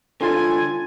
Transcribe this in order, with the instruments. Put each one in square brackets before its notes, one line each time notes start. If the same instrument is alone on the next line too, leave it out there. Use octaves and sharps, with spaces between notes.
[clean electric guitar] D3 F4 [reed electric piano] A4 C6 A6 [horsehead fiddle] G#5